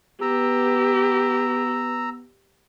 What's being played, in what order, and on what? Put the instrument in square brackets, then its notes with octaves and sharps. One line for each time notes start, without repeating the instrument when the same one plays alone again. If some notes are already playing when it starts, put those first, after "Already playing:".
[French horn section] B3 [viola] G4 [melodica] A#5 E6